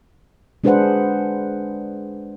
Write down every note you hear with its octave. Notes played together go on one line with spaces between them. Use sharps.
G#3 D4 G#4 B4 C5 F#5